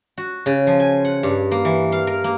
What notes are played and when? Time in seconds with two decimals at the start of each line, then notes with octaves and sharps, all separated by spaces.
0.18 F#4
0.46 C#3
0.67 F3
0.80 G#5
1.05 F#5
1.23 G2
1.51 A#3
1.65 E3
1.92 F5
2.07 A#4
2.24 A#3